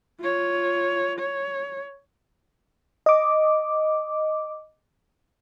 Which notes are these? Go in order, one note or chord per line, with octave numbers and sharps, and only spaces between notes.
F4 C#5
C#5
D#5 D6